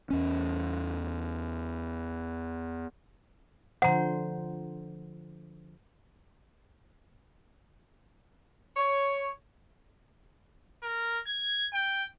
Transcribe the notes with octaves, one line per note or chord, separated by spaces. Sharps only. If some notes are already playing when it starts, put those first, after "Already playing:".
E2 C#4
D3 F3 C5 F#5 A#5
C#5
A#4
G#6
G5